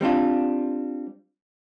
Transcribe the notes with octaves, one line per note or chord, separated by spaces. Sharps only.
G3 C4 D4 F4